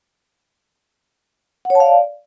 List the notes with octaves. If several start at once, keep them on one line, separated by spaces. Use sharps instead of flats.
F#5
C#5
A5
F5
D5